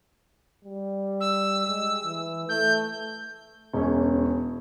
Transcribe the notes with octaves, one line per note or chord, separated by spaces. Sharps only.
G3
E6
G#3
E3
A3 G6
E1 C#4